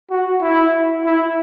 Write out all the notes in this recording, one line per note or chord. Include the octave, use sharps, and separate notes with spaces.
F#4
E4
E4